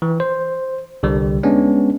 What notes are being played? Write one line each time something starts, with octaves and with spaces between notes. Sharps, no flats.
E3
C5
C2 D3 G3
G#3 B3 C#4 D4